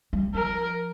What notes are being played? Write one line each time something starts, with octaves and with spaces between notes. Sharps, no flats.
G3
F3 A#4